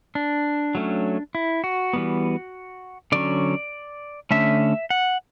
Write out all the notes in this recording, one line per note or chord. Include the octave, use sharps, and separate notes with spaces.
D4
F#3 A3 C#4
E4
F#4
E3 G3 B3
D3 F#3 C#4 D5
D3 A3 C#4 E5
F#5